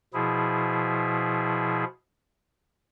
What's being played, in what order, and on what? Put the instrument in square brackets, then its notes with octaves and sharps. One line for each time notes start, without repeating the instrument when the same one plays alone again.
[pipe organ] B2 F3 E4 G#4